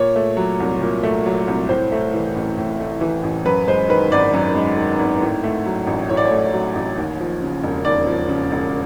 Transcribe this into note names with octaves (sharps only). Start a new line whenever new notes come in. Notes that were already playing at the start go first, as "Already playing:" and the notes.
Already playing: A#2 C#5
A3
F#3
C2
A#2
A3
F#3
C2
A2 C5
A3
E3
A1
A2
A3
E3
A1
F#2 B4
G#3 C5
D#3 B4
G#1 D5
F#2
G#3
D#3
G#1
A2
A3
F#3
A1
A2 C#5
D5
C#5
A3
F#3
A1
D#2
F3
C#3
E1
D#2 D5
F3
C#3
E1